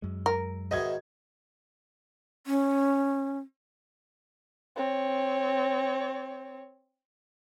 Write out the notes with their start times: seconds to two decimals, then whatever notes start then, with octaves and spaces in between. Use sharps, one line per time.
0.02 F#2 G#3
0.26 A#4
0.71 G#2 B2 D#3 D#5 E5 G#6
2.47 C#4
4.76 C4 C#5